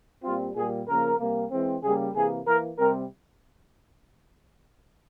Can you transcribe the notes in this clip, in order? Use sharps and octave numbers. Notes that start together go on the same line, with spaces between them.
A#2 G3 C4 F4
A#2 G3 A#3 G#4
C#3 F3 A#3 A#4
C3 G3 A#3
E3 G#3 C4
C#3 G3 A#3 G#4
C3 E3 A#3 G#4
E3 A#3 A#4
C3 G3 C4 A#4